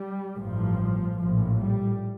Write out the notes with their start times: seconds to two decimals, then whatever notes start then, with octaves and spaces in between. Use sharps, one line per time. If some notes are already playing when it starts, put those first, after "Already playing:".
Already playing: G3
0.36 A1 G2 F3
1.19 A#1 A2 F3
1.61 G3